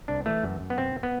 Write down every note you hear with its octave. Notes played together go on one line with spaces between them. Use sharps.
C2 D4
E3 A3
F#2
F#2
B3
B2 C4
B3